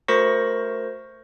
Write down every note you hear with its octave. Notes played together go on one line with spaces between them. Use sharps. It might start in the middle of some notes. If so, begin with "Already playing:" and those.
A3 F#4 A#4 C5 C#6 A#6